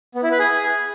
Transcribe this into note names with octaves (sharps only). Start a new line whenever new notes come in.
B3
E4
B4
G#4